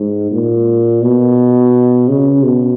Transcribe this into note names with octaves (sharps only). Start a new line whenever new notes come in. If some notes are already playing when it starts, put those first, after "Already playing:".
Already playing: G#2
A#2
B2
C#3
B2